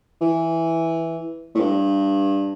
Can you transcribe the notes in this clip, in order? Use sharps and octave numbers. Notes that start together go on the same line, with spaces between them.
E3
A2
G2